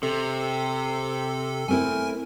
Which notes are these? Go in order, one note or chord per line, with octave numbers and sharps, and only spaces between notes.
C3 A4
A3 C4 E4 A#4 G#5